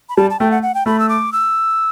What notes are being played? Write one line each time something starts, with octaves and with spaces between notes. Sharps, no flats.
B5
G3 A5
A5
A3 G5
F#5
F#5
G5
A3 B5
E6
D6
E6